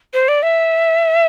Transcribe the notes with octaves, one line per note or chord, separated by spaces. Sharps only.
C5
D5
E5